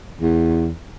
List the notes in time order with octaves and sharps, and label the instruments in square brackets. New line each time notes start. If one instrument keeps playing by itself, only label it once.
[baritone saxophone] E2